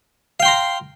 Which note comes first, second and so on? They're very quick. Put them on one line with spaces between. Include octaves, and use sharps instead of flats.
F5 G5 C6 A#5